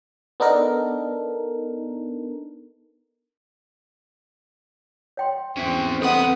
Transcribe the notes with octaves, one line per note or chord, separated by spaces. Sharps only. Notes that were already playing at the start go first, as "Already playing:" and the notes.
B3 D4 D#4 A4 A#4
C#5 G5 C6
E2 C4 C#4 E5
C4 A4 B4 F#5 B5 D#6